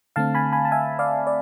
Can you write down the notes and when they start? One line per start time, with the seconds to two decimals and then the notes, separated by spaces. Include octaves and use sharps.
0.16 D3 A3 C4 F5 A5
0.35 G#5 B5
0.52 G#5 B5
0.65 A5
0.72 E5 G#5
0.99 D5 F5
1.27 D5